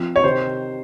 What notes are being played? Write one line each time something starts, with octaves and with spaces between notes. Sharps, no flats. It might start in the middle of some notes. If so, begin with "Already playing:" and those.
Already playing: F3 C4
C#5
C3 D#3 C5